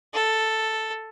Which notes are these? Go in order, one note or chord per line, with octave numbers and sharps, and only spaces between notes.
A4